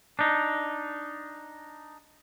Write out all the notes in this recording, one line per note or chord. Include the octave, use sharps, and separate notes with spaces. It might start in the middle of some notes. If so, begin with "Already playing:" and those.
D4 D#4